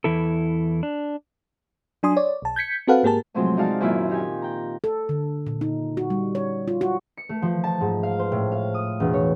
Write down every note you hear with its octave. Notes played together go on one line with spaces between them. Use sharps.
E2 E3 E4 A4
D4
F#3 D4 G#5 C6 D#6
C#5 D5
B1 A5
G6 G#6 B6 C#7
C4 F#4 A4 B4 F5 F#5
G#2 A#3 G4 G#4 A#4 A5
A2 C3 F3 F#3 G#3 C4
G#3 D#4 F#4 D5 F5 A5
F#2 A#2 D#3 E4 F4
D#4 G4 G#5
G5 A#5
A4
D3
A#2
D#4
F#4
G3
C#5
F4
F#4
C#7
A3
F3
A5
G#2
F5
C5
A2
F5
D#6
E1
C#5